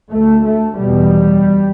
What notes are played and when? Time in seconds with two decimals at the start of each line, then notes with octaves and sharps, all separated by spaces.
0.12 D2 A3
0.45 A3
0.78 E2 B2 G3